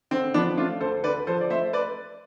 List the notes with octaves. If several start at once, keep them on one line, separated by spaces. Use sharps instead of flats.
D3 C4
F3 B3 D4
A3 D4 F4
D2 A4 C5
D3 B4 D5
F3 A4 C5
D5
A3 C5 E5
B4 D5